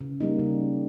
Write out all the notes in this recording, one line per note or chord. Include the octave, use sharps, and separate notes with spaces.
C#3
G3 A#3 D#4
C#3